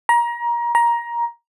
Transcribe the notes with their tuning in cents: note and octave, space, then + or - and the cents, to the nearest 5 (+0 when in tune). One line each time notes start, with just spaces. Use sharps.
A#5 +25
A#5 +15